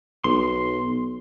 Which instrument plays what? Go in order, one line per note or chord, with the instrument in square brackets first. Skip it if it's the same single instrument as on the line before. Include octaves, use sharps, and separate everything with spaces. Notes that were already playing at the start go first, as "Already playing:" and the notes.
[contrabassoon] B1 [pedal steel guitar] C6